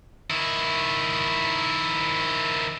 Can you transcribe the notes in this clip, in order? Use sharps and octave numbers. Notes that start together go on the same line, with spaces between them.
D#3 E4